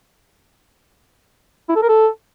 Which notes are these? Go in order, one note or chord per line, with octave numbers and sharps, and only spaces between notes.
E4
A4
A#4
A4